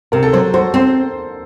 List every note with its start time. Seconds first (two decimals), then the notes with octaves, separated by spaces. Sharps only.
0.12 C3 A#4
0.23 A4
0.33 F#3 C5
0.54 F#4 C5
0.74 C4 C5